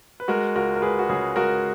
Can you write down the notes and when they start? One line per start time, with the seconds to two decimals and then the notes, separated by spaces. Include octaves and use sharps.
0.20 B4
0.28 G#3 F#4 A#4
0.55 C#2 F#4 A#4
0.76 A#4
0.82 C#2 G#4 B4
0.99 F#4
1.09 C#3 G#4
1.36 G#3 F#4 A#4